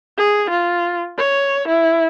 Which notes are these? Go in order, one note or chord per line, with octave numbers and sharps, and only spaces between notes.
G#4
F4
C#5
E4